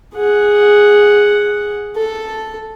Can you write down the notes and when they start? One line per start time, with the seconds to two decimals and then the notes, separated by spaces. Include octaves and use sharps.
0.15 G#4 F#5
1.96 A4